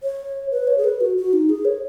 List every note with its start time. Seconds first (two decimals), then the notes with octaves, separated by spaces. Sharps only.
0.03 C#5
0.51 B4
0.67 C#5
0.78 G#4
0.84 B4
1.01 F#4
1.17 F#4
1.33 D#4
1.49 G#4
1.65 C#5